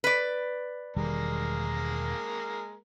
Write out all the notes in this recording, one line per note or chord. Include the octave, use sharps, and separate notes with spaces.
B4 D5
E1 D#3 G3 G#3 A#3 A#4